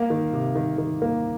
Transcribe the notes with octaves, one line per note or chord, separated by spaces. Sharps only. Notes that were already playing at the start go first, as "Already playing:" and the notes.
Already playing: A#3 F5
D#3
C3
D#3
D#3
A#3